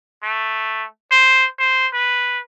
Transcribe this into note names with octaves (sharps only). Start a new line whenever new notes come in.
A3
C5
C5
B4